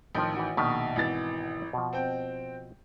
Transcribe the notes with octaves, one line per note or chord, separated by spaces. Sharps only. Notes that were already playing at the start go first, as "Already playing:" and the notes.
A1 D#3 F3 D#4 G5
E3 F#4
A#1 B2 D#3 A5
G#1 E3 A6
B2 F3
C4 G5